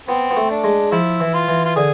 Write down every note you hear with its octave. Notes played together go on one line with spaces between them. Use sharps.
B3 C4
B3
A3
D4
G#3
F3 E4
E3
F4
E3
F4
D3 G#4